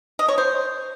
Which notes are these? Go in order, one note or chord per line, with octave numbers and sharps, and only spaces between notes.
D#5
C#5
C5